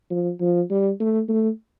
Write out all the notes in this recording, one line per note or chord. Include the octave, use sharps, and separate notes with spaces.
F3
F3
G3
A3
A3